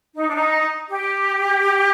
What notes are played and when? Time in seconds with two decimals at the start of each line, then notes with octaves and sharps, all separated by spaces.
0.14 D#4
0.28 D4
0.35 D#4
0.90 G4